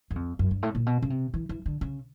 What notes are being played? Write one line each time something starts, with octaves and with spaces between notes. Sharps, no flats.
F#2
F2
F#2
G2
A2
A#2
B2
C#3
C3
E3
E3
D3
C#3